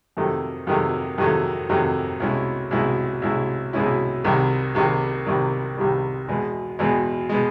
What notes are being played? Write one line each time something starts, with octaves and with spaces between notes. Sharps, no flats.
F2 C3 D#3 F#3 A3
F2 C3 D#3 F#3 A3
F2 C3 D#3 F#3 A3
F2 C3 D#3 F#3 A3
C2 B2 G#3 C#4 E4
C2 B2 G#3 C#4 E4
C2 B2 G#3 C#4 E4
C2 B2 G#3 C#4 E4
C2 C3 D#3 G3
C2 C3 D#3 G3
C2 C3 D#3 G3
C2 C3 D#3 G3
E2 B2 G#3
E2 B2 G#3
B2 G#3